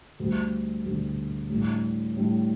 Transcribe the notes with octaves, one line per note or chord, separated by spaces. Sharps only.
D2 D3 G3
D2 D3 G3
A2 G3 D4
A2 G3 D4